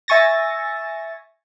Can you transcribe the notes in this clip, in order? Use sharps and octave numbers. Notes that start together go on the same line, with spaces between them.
E5 G#5 C#6 A6 A#6